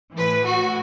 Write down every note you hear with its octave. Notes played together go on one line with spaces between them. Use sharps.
A2 E3 B4
F#4